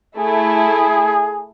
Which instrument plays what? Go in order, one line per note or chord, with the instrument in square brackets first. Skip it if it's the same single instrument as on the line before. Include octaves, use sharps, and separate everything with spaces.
[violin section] A3 E4 [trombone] G#4